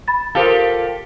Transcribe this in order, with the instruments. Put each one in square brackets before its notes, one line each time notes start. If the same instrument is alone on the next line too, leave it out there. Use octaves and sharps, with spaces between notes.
[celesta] B5 A6
[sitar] F4 G4 A4 [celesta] A#4 C5 F5